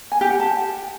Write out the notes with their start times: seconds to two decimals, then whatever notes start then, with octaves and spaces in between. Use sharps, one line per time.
0.12 G#5
0.21 G4
0.30 F#5
0.39 A5